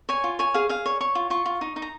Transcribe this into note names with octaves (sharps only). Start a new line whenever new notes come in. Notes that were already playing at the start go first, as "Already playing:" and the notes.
C#5 G#5
F4
C#5 G#5
G#4 F5
G#4 F5
C#5
C#5 C#6
F4
F4 C#6
F4
D#4
D#4
A#5